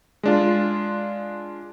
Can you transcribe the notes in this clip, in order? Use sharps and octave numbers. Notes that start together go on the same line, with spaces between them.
G#3 D4 F4